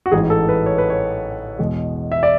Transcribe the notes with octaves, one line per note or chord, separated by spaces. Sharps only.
F#4
A1 G#2 E3 G#4
A4
B4
C#5
B4
C#5
E2 B2 G#3
E5
D5